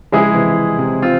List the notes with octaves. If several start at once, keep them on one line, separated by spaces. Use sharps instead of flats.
C#3 F3 G#3 E4 G#4
C3 E3
C3
C4 F4